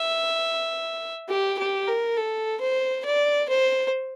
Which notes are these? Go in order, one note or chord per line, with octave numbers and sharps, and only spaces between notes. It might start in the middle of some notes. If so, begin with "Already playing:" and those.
Already playing: E5
G4
G4
A#4
A4
C5
D5
C5